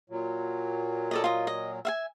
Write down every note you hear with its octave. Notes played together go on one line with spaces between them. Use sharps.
A#2 F#3
A4 D5 D#5
F4 D#5
D#5
E5 F5 G#5